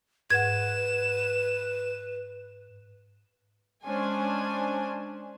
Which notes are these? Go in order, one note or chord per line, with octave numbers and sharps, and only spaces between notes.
G#2 B4 F#5 G#6 E7
G#3 C#4 D4 C5 G#5